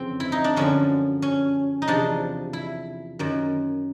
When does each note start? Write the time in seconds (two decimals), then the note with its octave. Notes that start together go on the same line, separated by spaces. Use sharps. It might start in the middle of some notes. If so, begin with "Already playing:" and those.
Already playing: F2 C#3 E3 C4
0.20 E4
0.32 D#4
0.44 D4
0.56 F#2 D3 F3 C#4
1.22 C#4
1.82 D#4
1.87 E2 C3 F3 D4
2.53 E4
3.19 F#2 D#3